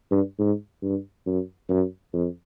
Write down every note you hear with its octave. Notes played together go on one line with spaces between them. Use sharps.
G2
G#2
G2
F#2
F#2
F2